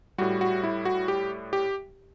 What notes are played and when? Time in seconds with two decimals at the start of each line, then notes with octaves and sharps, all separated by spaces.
0.18 A2 G3 F#4
0.41 F#4
0.64 E4
0.85 F#4
1.08 G4
1.53 G4